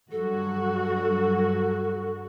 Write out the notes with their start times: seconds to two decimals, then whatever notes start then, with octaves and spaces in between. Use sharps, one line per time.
0.12 G2 F#3 F#4 A4